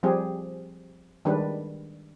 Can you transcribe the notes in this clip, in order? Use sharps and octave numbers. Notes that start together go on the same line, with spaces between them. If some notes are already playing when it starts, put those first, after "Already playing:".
F3 G3 C4 G4 G#4
D#3 G3 G#3 D4 B4